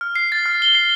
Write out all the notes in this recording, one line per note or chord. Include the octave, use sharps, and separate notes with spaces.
F6
C7
A6
F6
G7
C7